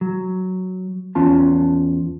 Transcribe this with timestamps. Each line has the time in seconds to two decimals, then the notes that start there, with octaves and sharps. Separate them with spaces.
0.01 F#3
1.15 E2 C#4 F4 A5